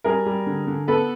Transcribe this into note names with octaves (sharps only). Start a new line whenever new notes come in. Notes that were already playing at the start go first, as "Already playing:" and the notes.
G3 G#4 A#4
G3
D3
D3
B3 A4 B4